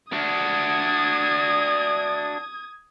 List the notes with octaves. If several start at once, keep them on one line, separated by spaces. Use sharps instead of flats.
D4 F#4 D#6 G#6